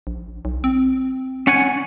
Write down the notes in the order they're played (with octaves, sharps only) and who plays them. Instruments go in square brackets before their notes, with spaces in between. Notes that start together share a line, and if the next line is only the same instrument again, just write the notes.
[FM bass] A#1
B1
C4
[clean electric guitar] C#4 F#5 G#5